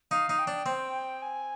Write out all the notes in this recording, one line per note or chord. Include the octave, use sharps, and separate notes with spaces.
D#4 F5
D#4
G5
D4
C4
G#5